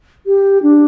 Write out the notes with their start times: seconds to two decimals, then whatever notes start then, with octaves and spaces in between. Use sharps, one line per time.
0.26 G4
0.63 D4